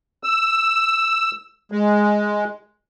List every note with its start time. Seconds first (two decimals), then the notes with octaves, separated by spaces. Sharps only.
0.23 E6
1.72 G#3